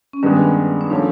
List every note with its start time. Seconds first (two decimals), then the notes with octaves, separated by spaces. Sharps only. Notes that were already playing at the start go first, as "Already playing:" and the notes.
0.13 C#4
0.23 G2 D#3 G#3 B3 D4
0.81 D4
0.90 F3 A3 C#4 D#4